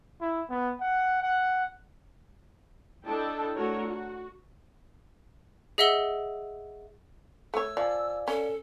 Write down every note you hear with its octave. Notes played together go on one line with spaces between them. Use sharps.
E4
B3
F#5
F#5
D4 E4 A4 D#5 G5 A5
A3 D4 F#4 A#4 C#5
F#4
G#4 D#5 E5 F#5 E6 G7
A3 C#5 E6
F3 D5 F5 G#5
C#4 A4